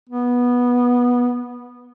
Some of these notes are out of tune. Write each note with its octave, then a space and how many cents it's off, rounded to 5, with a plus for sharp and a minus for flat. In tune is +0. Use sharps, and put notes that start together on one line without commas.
B3 -15